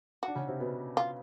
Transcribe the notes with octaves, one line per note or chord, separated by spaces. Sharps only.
F#4
D4
C#3 C#4
C3 C4
B2 B3
F4